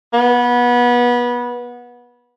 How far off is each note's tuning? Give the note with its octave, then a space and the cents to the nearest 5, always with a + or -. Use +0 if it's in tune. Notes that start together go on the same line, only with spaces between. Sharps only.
B3 -25